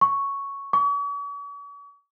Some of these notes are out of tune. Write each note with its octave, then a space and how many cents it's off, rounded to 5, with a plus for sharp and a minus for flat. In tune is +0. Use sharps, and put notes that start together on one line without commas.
C#6 +0
C#6 +45